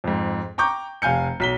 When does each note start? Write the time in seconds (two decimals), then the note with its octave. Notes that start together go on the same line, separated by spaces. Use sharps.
0.04 F2 G#2
0.58 G5 A#5 C#6 D6 G6
1.02 F1 F5 G#5 G6 C#7
1.40 B1 B6 G7